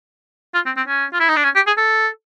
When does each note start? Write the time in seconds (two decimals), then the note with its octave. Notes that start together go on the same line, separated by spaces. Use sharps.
0.54 F4
0.66 C4
0.77 C4
0.88 C#4
1.13 F4
1.20 E4
1.29 D#4
1.36 D4
1.44 C#4
1.55 G4
1.67 G#4
1.77 A4